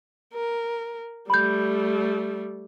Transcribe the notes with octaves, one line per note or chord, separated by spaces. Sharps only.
A#4
G3 A3 B5 G6